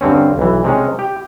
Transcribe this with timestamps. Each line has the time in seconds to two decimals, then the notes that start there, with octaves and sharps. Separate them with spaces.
0.01 G2 D3 C4 C#4
0.38 B1 E3
0.64 C3 G#3 C#4
0.99 G4